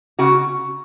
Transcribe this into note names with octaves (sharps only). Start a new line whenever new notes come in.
C#3 F#4